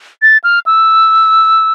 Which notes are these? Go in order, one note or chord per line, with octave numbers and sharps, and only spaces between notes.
A6
F6
E6